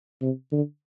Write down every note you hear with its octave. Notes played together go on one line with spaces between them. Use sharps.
C3
D3